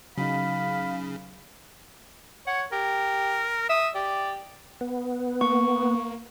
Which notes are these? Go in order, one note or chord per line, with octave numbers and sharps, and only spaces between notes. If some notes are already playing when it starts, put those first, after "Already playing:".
C#3 F#3 D#4 F5 B5
C#5 F#5
G4 A#4
E5 D#6
G4 D5
B3
A#3 C#6